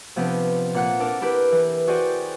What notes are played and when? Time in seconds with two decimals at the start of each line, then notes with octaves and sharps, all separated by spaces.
0.16 C3 F3 B3 C4 D4
0.74 A#2 F#5 F#6
1.00 D4 A4 A#4
1.21 D4 E4 G4 A#4 B4
1.52 E3
1.87 F#4 G#4 C5 D5 G5 G#5